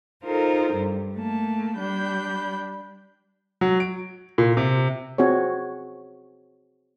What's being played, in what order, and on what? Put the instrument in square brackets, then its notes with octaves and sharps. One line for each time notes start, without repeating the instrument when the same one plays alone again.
[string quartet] D#4 F4 A4 A#4 C5
G2 G3
A3 A#3 A5
G3 D4 B5 G6
[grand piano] F#3
D7
A#2
C3
[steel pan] C4 F#4 G#4 C#5